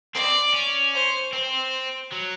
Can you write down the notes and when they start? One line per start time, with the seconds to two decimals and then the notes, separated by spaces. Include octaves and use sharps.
0.14 C4 D5
0.54 C#4
0.94 C5
1.33 C4 C5
2.12 F#3